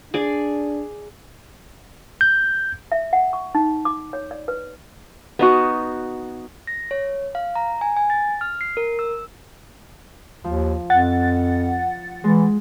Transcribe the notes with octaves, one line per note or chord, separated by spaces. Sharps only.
D4 G#4 D5
G6
E5
F#5
C#6
D#4
D6
C#5
D5
B4
B3 D#4 F#4
A#6
C#5
F5
A#5
G#5
G#5
A6
F6
C7
A#4
E6
D#2 F3
F2 F#5 A6
E3 G#3